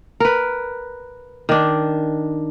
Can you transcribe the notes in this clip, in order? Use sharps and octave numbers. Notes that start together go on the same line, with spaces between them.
A#4 B4
D#3 D4